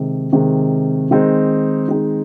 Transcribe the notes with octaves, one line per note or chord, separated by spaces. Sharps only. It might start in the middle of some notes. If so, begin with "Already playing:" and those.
Already playing: C3 D#3 G#3
C3 D#3 G#3
D#3 G#3 C4 D#4
D#3 G#3 C4 D#4